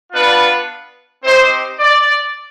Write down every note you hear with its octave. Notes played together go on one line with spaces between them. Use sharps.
B3 D4 F4 B4
C4 D#4 G4 C5
D5